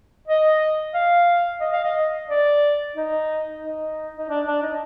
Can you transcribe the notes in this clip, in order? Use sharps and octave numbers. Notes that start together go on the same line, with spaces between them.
D#5
F5
D#5
F5
D#5
D5
D#4
D#4
D#4
D4
D4
D#4